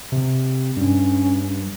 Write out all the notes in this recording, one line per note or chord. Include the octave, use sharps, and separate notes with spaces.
C3
G2 C#4